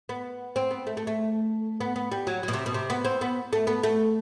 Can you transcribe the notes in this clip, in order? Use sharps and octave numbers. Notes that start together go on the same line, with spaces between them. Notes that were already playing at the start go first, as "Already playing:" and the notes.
B3
C4
B3
A3
A3
A3
B3
B3
G3
F#3
B2 F#3
C3
B2
C3
B3
C4
B3
A3
B3
A3